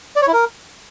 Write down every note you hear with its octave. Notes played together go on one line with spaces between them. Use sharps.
D5
C#5
E4
A#4